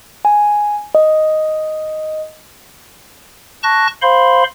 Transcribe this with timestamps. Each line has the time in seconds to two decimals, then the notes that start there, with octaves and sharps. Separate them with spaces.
0.25 G#5
0.95 D#5
3.63 A5 C#6 F#6 A#6
4.02 C5 F5 B5 C6